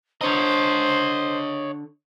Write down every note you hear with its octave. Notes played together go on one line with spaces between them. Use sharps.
D3 D4 C5 C#5 D#5 A#5